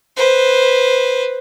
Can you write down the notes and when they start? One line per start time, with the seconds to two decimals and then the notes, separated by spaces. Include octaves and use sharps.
0.17 B4 C5